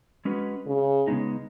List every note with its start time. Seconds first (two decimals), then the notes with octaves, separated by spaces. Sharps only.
0.25 G#3 C#4 F#4 B4
0.66 C#3
1.08 C#3 G#3 B3 D#4